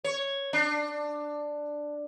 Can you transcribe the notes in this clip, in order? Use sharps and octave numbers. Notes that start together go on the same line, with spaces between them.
C#5
D4